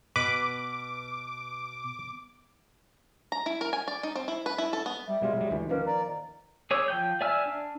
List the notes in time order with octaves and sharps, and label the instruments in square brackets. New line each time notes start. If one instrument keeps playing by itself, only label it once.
[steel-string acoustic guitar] B2 [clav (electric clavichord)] B4 [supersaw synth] D6
[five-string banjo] A#5
E4
A#4
G#5
D5
D#4
C4
E4
B4
E4
A4
B3
[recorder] G3 [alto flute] E5
[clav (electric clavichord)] B2 G3 F4 [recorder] G#3
[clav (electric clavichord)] F#3 G3
D2 E3
[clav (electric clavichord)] D#3 F3 A#3 [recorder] C#4 [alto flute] B4
[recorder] D5 [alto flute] A#5
[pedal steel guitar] G#4 C#5 D6 E6
F3 G5 G6
D5 E5 G#5 E6 F6
D4